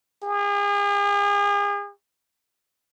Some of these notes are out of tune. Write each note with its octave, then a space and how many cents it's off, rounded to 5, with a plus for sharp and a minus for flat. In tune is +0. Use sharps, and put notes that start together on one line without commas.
G#4 -40